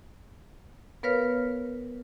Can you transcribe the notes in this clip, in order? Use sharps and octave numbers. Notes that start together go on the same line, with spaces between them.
B3 A#4 B4 C#5 F5 F6